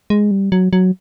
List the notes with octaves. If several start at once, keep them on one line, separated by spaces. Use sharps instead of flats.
G#3
G3
F#3
F#3